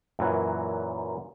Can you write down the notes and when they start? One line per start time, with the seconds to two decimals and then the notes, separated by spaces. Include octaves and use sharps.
0.19 F#2 A#2 E3 F#3